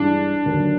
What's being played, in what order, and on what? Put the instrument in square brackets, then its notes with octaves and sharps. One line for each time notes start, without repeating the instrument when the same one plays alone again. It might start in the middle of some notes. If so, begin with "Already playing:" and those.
Already playing: [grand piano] G2 E3 G#3 [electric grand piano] D4
[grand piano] D#2 D3 F#3